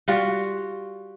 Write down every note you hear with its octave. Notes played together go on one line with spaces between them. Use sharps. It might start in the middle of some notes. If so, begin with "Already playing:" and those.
G3 F4 F#4